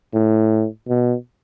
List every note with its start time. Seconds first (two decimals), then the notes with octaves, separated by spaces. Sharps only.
0.13 A2
0.88 B2